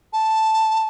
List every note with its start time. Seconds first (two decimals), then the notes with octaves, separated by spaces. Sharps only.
0.13 A5